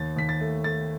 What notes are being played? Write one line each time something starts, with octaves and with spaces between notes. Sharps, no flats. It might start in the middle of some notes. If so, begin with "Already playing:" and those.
Already playing: D#2 A6
D#2 B6
A6
A3
A3 A6